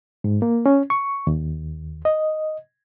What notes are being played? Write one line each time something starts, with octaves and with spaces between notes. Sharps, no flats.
G#2
A#3
C#4
C#6
D#2
D#5